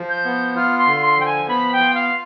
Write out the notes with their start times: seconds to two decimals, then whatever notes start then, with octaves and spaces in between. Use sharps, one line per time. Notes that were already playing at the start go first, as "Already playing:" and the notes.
Already playing: F3
0.09 G6
0.25 B3
0.56 F4 F6
0.78 C6
0.87 D3
1.02 C6
1.17 F3 G5
1.25 G#5
1.48 B3 B5
1.73 G5
1.80 F4
1.95 F5